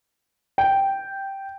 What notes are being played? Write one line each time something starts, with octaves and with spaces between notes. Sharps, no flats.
G5